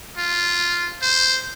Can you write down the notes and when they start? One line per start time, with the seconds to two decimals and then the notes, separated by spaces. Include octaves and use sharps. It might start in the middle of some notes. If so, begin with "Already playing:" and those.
0.17 F4
1.02 C5